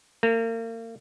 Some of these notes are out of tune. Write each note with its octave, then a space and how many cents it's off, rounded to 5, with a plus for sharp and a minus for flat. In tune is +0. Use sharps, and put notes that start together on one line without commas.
A#3 -35 A#4 -35